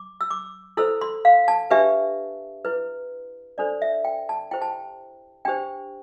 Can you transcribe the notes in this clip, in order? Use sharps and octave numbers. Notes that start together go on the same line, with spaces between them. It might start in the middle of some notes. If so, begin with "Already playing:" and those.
Already playing: D6
E6
D6
E4 A4 C5 E6
C6
F5
A5
D4 G4 B4 E5
E4 B4
D4 A4 C5 D5
E5
G5
A5
E4 G4 C5 G5
A5
G5
D4 G4 C5 G5